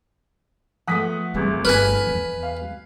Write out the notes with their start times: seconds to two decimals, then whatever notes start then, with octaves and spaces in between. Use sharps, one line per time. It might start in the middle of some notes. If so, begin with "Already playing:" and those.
0.87 F3 A3 B3 F#5 D#6 B6
1.34 G1 E2 C3 E3 G3
1.65 G1 D#4 B4 G#5 F6 B6
2.07 E2
2.43 F5